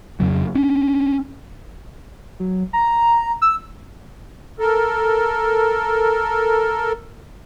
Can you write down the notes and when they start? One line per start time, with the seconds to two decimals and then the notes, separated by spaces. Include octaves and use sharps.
0.20 F2 C#3 F#3
0.55 C#4 D4
2.40 F#3
2.73 A#5
3.42 E6
4.59 A4 A#4